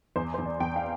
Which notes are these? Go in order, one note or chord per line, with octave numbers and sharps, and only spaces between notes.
E2 C5
E2 C5
D5
E2 G5
F5